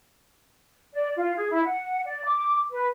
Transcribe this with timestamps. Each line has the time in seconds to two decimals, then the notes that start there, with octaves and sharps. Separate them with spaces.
0.94 D5
1.16 F4
1.36 G#4
1.50 E4
1.63 F#5
2.05 D5
2.24 D6
2.71 B4